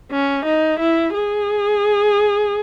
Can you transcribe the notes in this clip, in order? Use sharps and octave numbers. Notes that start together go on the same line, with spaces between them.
C#4
D#4
E4
G#4